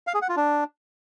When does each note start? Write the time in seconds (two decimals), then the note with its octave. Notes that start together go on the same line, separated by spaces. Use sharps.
0.07 F5
0.14 G#4
0.22 F#5
0.29 F4
0.36 D4